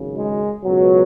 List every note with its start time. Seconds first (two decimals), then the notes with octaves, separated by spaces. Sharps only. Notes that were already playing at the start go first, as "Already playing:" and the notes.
Already playing: G#1 F#2 C#3
0.16 G#3
0.64 C#2 B2 F#3